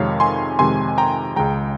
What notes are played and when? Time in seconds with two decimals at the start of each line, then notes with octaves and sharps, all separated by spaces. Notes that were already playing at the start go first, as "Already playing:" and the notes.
Already playing: F2 C3 D#3 G#3 C#5 F5
0.20 G#5 C6
0.59 F2 C3 D#3 G#3 G#5 C6
0.98 G5 A#5
1.36 C#2 C#3 G#3 G5 A#5